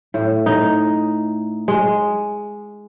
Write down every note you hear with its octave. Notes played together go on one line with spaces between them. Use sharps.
A2
D#4
G#3